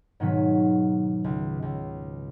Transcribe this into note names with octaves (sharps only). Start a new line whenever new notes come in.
G#2 B2 D#3 F#3 G#4 B6
C#2
C#2